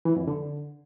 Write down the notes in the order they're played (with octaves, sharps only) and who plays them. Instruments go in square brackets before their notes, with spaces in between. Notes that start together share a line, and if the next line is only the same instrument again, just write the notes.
[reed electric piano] E3
F2
D3